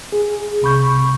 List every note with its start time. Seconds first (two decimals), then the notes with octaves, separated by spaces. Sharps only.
0.12 G#4
0.62 C2 C3 B5 C#6 G6